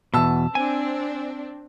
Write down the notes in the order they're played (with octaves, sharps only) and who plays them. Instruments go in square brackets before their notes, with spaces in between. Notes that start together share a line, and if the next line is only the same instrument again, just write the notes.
[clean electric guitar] E2 B2 [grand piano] A5 E6
[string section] C4 D4 [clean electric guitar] G#5